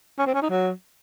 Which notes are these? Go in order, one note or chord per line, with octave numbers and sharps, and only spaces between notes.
C#4
C4
C#4
D#4
F#3